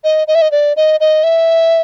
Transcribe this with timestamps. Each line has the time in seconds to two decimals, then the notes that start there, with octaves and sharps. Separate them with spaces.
0.04 D#5
0.28 D#5
0.35 E5
0.42 D#5
0.51 D5
0.76 D#5
1.00 D#5
1.24 E5